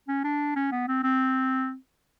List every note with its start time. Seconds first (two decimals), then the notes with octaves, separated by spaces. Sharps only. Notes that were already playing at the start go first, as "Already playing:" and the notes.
0.08 C#4
0.24 D4
0.56 C#4
0.72 B3
0.88 C4
1.03 C4